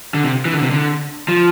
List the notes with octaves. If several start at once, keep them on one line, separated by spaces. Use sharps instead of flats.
D3
C3
E3
D3
C3
D3
F3